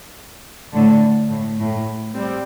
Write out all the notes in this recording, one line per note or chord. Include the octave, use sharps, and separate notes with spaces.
A2 D3
A2
A2
G3 C4